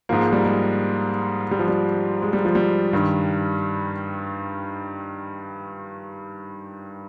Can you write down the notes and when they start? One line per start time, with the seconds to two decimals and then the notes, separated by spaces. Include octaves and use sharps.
0.09 G#2 F3 A#3
0.21 G#3
0.33 G3
0.45 G#3
1.51 G3
1.59 F3
1.68 G3
2.22 G#3
2.33 G3
2.45 F3
2.55 G3
2.93 G2 D#3